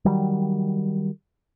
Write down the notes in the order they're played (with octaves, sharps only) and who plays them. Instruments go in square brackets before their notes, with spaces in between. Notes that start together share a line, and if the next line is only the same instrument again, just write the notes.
[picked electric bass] D#3 F#3 G3